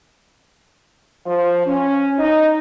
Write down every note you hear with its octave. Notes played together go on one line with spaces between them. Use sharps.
F3
C#4
D#4